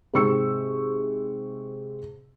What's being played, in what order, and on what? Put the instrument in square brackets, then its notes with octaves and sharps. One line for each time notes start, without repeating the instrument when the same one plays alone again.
[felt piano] G#2 C3 C4 C#6 E6 C#7